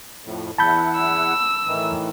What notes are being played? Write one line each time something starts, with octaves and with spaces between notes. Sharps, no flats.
F2 A2
E2 E4 F#5 A5 B5 G6
E6
A2 D#3 E3